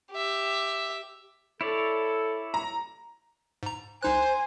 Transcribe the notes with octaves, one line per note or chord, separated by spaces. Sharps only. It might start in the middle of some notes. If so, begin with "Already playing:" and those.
G4 E5
E4 A4 C#5 D5
A#5
G#2 A#5
C2 D#4 C5 G#5 F#6